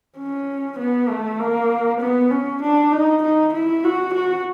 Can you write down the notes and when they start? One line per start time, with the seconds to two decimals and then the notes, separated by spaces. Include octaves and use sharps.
0.18 C#4
0.79 B3
1.09 A3
1.40 A#3
2.00 B3
2.31 C#4
2.62 D4
2.92 D#4
3.22 D#4
3.53 E4
3.84 F#4
4.14 F#4